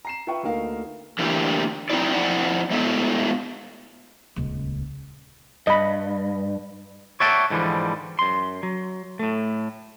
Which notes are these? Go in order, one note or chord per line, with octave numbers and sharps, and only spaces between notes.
A#5 C7 E7
F4 B4 E5 G5 C#6
D2 A3 A#3 D#4 A#4 F5
D3 E3 A3 A#3 E4 G4
F#3 C4 D#4 E4 D5
F2 E4 D5 F#5
G#3 A3 B3 E4 A4 C#5
D#1 C#2
G2 D#5 B5
C#5 D5 E5 F#5 G5 A5
G#2 D3 E3 F3 G3
F#2 C6
F#3
A2 A3